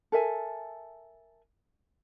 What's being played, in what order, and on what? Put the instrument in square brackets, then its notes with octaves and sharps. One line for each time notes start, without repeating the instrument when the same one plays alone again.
[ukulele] A4 A#4 E5 G#5